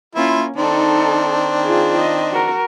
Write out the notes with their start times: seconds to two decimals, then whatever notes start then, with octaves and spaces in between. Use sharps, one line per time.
0.15 A#3 C#4 E4 F4
0.56 D#3 C4 D4 D#4 A4
1.64 F4 G#4
1.99 D#5
2.32 F#4 A#4